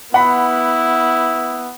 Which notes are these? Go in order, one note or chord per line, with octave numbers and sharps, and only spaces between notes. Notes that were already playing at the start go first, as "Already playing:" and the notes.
B3 E4 F#5 B5